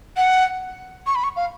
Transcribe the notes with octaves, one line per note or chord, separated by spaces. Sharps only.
F#5
C#6
B5
C#6
F5